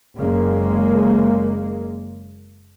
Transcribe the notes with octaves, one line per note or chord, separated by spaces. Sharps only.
F#1 C#3 G#3 A#3